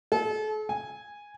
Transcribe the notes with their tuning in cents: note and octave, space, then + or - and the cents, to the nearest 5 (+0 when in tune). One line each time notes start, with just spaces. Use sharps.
A4 -40
G#5 -10